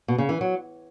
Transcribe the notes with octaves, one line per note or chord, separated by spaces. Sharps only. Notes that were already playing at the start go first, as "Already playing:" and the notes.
B2
C#3
E3
F#3